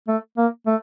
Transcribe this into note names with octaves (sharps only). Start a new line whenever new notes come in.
A3
A#3
A3